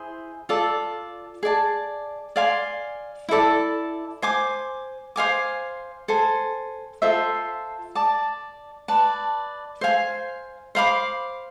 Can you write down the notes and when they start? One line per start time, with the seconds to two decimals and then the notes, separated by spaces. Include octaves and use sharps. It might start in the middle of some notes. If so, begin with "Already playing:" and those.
Already playing: E4 G#4 C5
0.49 F4 A4 D5
1.43 G#4 D5 A5
2.36 D5 F5 G#5 C6
3.29 E4 A4 D5 A5
4.22 C5 G#5 D6
5.16 C5 F5 G#5 D6
6.08 A4 C5 G#5
7.02 F4 A4 C5 E5
7.95 D5 A5 D6
8.88 B4 D5 A5
9.81 C5 F5 G#5
10.75 C5 F5 B5 D6